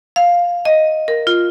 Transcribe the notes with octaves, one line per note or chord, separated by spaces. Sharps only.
F5
D#5
A#4
F4